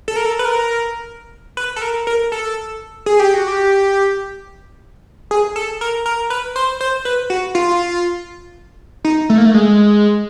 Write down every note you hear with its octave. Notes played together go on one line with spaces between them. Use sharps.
A4
A#4
A4
B4
A#4
B4
A4
A#4
A#4
A4
G#4
G4
F#4
G4
G#4
A4
A#4
A#4
B4
C5
C5
B4
F#4
F4
D#4
A3
A#3
A3
G#3